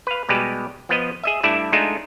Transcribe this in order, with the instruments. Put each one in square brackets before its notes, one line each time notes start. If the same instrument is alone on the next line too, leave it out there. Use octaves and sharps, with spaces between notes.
[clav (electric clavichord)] B4 F5
B2 G3 G#3 G4 B4
F3 B3 B4 D#5
G#4 D#5 E5
G2 A3 E4 D5 E5
G#3 A3 D4 D#4 F4 A4